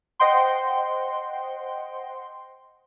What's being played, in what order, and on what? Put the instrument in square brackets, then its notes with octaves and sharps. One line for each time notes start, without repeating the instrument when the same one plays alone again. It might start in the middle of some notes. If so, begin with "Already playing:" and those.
[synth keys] C5 D#5 F#5 G5 C6